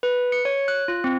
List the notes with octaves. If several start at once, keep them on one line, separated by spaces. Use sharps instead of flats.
B4
C#7
C#5
F#6
F4
C4